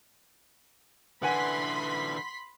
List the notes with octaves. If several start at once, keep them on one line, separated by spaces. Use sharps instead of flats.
D3 E3 B4 F#5 G#5 B5 C6 B6